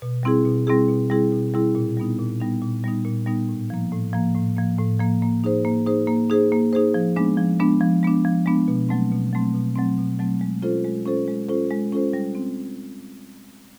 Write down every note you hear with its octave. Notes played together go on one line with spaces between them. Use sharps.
B2
G3 C4 E4 G#4
B2
G3 C4 E4 G#4
B2
G3 C4 E4 G#4
B2
G3 C4 E4 G#4
A#2
G3 B3 D#4
A#2
G3 B3 D#4
A#2
G3 B3 D#4
A#2
G3 B3 D#4
A2
F3 A#3
A2
F3 A#3
A2
F3 A#3
A2
F3 A#3
A#3
D#4 G#4 C5
A#3
D#4 G#4 C5
A#3
D#4 G#4 C5
A#3
D#4 G#4 C5
F3
G#3 B3 D4
F3
G#3 B3 D4
F3
G#3 B3 D4
F3
G#3 B3 D4
B2
F#3 A3 C4
B2
F#3 A3 C4
B2
F#3 A3 C4
B2
F#3 A3 C4
G#3
C#4 F4 A4 C5
G#3
C#4 F4 A4 C5
G#3
C#4 F4 A4 C5
G#3
C#4 F4 A4 C5
G3
C4